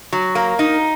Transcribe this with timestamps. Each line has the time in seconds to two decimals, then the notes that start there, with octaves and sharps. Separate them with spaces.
0.13 F#3
0.35 A#3
0.59 D#4